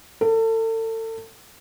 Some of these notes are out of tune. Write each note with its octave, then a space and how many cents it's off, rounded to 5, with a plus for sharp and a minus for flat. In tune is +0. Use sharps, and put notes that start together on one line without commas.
A4 +35